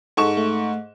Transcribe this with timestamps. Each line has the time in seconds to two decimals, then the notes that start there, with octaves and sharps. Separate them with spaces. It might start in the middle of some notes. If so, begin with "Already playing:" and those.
0.17 G#2 A4 C#6 E7
0.37 A3